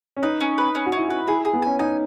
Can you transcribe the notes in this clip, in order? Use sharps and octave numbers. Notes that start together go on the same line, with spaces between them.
C#4
D#4 B4
C#4
B4
C#4
F#4
C#4 E4
F#4 B4
E4 G#4
G#4
B3
C#4 G#5
D#4 G#5